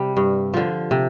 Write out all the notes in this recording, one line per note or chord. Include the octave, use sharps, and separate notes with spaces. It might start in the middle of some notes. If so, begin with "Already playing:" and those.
Already playing: C3 G3
G2
D3 F3
C3